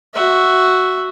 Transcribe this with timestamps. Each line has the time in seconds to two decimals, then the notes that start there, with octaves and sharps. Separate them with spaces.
0.14 F#4 E5